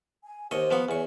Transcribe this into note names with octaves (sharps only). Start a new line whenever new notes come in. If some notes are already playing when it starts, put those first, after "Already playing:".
G#5
D#2 G4 C5 D#5 C#6
F3 B3 C#6
E2 C#5 G#5 C#6